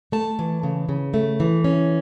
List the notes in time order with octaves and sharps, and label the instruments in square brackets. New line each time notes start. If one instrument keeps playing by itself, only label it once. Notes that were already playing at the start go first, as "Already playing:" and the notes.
[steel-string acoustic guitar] A3 A5
E3
C#3
C#3
A3
E3
C#4